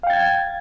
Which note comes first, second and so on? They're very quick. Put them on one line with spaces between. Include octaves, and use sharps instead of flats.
F5 G5 A6 G#6